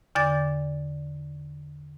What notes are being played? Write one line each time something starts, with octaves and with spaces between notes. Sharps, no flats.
E2 D3 D5 D6 A6